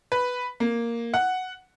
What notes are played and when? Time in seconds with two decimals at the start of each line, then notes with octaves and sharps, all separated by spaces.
0.12 B4
0.60 A#3
1.14 F#5